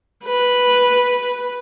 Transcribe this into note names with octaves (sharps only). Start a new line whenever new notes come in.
B4